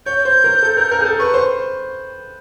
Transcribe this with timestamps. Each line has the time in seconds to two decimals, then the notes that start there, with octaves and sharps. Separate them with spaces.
0.06 C#5 G6
0.25 C5
0.44 A#4
0.62 A4
0.77 A#4
0.91 A#4
1.00 G#4
1.05 A4
1.19 B4 C#6
1.34 C5